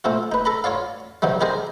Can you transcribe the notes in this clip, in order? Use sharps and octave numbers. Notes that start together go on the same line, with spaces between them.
A#2 A3 C4 F4
D#4 B4
A4 A#5 B5
F4 C#5 D5 F5
G2 C3 D#3 F#3 G3
D#4 G4 G#4 A#4 C5 D#5